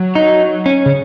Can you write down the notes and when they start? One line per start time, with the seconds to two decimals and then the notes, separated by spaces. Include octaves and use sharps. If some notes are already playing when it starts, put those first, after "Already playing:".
Already playing: F#3
0.15 D#4
0.66 C#4
0.86 C#3